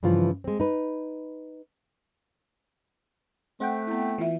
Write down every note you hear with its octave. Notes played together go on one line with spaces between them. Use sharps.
G2 C#3 E3 F3 F4
G#3 C4
D#4 B4
A3 C4 F#5 G5
B3 E4
E3 F4 E5